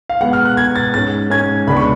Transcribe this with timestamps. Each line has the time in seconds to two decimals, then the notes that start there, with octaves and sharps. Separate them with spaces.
0.09 F5
0.20 B2 G#3 B3 F#5
0.33 F6
0.45 F#6
0.57 B2 G#3 B3 G#6
0.75 A6
0.94 G#2 G#3 C#4 A6
1.30 G#2 G#3 C#4 G#6
1.67 C#2 B2 G#3 D4 B5
1.77 C#6